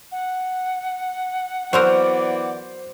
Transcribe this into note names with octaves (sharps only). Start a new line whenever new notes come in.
F#5
E3 F#3 B3 C4 A#4 C5 D5